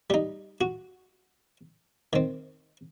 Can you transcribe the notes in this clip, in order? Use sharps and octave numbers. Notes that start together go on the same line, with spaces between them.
G3 D#4
F#4
D#3 C4